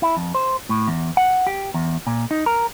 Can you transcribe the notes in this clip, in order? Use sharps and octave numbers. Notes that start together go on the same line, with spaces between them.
E4
F2
C5
A2
E2
F#5
G4
E2
A#2
D#4
A#4